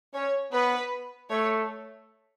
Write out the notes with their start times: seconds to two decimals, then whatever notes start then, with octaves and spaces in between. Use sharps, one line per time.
0.14 C#4 C#5
0.53 B3 B4
1.30 A3 C#5